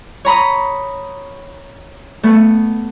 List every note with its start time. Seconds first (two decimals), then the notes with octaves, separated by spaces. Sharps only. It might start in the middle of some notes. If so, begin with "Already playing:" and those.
0.25 C#5 A#5 B5 D#6
2.23 A3 B3